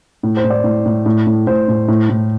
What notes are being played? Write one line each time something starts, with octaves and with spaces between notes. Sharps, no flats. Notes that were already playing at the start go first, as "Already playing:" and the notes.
A2
C5
A2
D5
A2
A2
A2
A2
A2 C5
A2
A2
A2